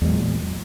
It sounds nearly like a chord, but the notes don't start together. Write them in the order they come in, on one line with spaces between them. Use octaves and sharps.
E2 G#3 F#3 A#2